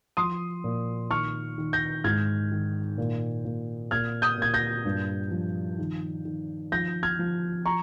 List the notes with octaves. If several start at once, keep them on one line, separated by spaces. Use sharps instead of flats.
F3 C6 D#6
A#2
D#3 C#6 F6
D#3
G6 A#6
G#2 F6 G#6
D#3
A#2
A#2
A#2 F6 G#6
D#6 G6
A#2 G#6
G6 A#6
G2
F3
D#3
D#3
F3 G6 A#6
F6 G#6
F3
A#5 C#6